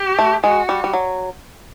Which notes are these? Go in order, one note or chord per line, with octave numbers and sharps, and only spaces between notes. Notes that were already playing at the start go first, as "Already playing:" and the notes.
Already playing: G4
A3
G#3 F#4
G3
G3
F#3